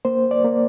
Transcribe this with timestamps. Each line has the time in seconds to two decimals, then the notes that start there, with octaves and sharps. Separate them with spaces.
0.05 A#3 C5
0.31 D5
0.44 A#3